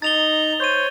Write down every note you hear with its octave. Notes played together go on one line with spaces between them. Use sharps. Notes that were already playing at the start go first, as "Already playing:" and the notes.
D#4 A#5 A6 F7 G7
C5 C#5 G6 D#7